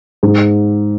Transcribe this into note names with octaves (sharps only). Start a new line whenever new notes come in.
G#2